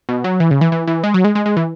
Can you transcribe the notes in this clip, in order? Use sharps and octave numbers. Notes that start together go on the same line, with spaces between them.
B2
F#3
E3
C#3
E3
E3
E3
G#3
F#3
G#3
G#3
G#3
E3